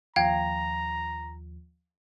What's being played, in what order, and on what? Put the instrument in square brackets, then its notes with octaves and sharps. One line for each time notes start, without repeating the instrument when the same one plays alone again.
[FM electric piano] D#2 F3 [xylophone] F5 G5 G#6 [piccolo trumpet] A#5